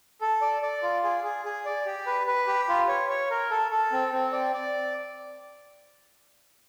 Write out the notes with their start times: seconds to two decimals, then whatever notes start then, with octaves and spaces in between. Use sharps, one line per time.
0.21 A4
0.42 D5
0.62 D5
0.83 F4
1.04 G#4
1.24 G#4
1.45 G#4
1.65 D5
1.86 G4
2.07 B4
2.27 B4
2.47 G4
2.69 F4
2.88 C#5
3.09 C#5
3.31 A#4
3.51 A4
3.71 A4
3.92 C4
4.13 C4
4.32 D5
4.53 D5